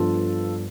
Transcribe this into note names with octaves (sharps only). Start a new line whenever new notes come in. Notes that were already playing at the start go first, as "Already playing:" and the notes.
Already playing: G2 F3 B3 D4 F4 A4